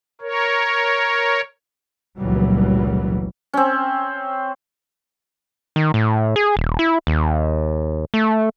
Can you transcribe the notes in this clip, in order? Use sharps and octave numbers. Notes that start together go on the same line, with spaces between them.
A#4 C#5
F1 C#2 A#2 E3 F#3 G3
C4 C#4
D#3
A2
G#4
D#1
E4
D#2
A3